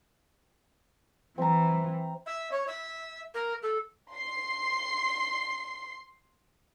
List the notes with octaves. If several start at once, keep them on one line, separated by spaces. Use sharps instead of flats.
E3 C4 A#5
E5
C#5
E5
A#4
A4
C6 C7